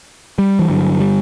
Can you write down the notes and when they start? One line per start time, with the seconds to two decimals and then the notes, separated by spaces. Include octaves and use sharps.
0.39 G3
0.59 E3
0.70 G2 D3 F#3
1.00 G3